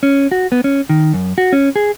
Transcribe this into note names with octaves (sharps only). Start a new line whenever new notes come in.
C#4
F#4
B3
C#4
D#3
F#2
F#4
C#4
G#4